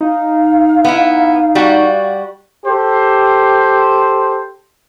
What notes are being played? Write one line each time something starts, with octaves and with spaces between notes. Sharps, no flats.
D#4 F5
B3 E4
G3 F#4
G4 A4 C5